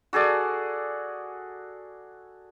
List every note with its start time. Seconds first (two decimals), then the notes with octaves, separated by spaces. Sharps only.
0.13 F#4 G#4 A4 D5